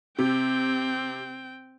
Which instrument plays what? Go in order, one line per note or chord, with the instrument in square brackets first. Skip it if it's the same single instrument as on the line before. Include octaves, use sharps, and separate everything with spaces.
[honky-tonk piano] C3 [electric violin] C4 G5